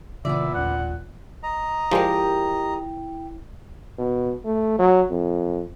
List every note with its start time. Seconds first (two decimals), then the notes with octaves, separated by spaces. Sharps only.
0.25 A#2 C#3 E3 A#3 B3 D5 E5
0.54 A1 D#2 C#4 F#5
1.43 D#5 A#5
1.91 F3 G#3 E4 G4 A#4 D5 G5
3.98 B2
4.45 A3
4.79 F#3
5.10 F2